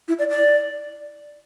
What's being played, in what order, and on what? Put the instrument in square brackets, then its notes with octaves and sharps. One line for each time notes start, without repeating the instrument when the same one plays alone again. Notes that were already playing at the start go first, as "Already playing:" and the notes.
[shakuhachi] E4
D5
D5